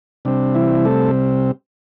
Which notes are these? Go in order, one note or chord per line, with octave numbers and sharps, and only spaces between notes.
C3 G3 C4 D4
E3 E4
A3 A4